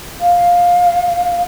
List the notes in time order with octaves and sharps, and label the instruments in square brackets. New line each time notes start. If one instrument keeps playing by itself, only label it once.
[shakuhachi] F5